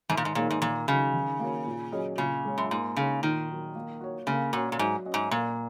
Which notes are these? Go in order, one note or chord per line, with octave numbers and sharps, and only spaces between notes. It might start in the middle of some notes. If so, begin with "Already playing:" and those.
G#2 D#3
A#2
G#2
A#2 A#3 D#4 G#4 C#5
G#2
A#2 D#3
C#3 F#3 D#4
D#3
A#3 F#4 C#5
A#2
F#3 C#4 G#4 D#5
A#2 C#3
G#3 C#4
F#2
G#2 A#3
C#3 D#4 G#4 C#5
A#2 D#3
F#3 D#4 A#4
A#3
F#4 C#5
C#3 A#3
A#2 C#4 F#4
A#2
G#2 F#3
C#4 F#4 D#5
G#2
A#2 A#3